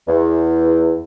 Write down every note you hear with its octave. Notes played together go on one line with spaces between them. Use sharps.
E2